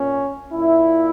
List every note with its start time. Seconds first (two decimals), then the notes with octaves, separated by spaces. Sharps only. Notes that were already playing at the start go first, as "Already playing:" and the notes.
Already playing: A#2 C#4
0.53 A#2 E4